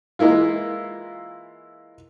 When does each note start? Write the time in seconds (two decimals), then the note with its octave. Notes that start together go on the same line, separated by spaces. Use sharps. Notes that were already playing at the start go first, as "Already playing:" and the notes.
0.19 E3 G#3 A#3 E4 F4